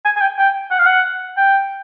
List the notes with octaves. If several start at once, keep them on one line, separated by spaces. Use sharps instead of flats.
G#5
G#5
G5
G5
F#5
F5
F#5
G5